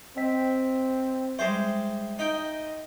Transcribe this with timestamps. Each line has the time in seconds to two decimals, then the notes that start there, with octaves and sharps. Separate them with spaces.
0.17 C4 D#5 G5 B6
1.39 G3 G#3 C5 E5
2.19 D#4 D#5 G5